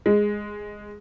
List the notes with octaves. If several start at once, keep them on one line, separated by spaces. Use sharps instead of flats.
G#3